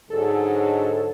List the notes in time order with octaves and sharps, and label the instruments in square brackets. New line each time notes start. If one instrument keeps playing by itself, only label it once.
[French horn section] G#2 D3 F#3 [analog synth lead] A4